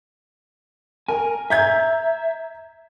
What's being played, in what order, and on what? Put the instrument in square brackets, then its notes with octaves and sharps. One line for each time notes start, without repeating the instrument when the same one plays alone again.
[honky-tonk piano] A#4 [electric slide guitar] G#5
[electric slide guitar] E5 [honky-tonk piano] A#5 G6 G#6